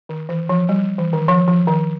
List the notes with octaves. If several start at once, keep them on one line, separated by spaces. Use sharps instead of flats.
D#3
E3
F3
G3
E3
D#3
F3
F3
D#3